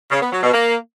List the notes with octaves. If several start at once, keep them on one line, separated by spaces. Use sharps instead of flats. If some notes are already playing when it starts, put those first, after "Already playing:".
C#3
B3
F#3
B2
A#3